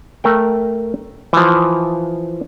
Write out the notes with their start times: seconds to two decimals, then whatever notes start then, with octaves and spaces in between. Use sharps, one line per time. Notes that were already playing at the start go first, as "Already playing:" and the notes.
0.24 A3 A#4 G5
1.33 E3 F3